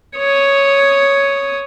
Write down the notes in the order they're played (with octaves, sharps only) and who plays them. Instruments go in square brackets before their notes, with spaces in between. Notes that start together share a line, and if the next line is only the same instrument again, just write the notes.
[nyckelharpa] C#5 D#6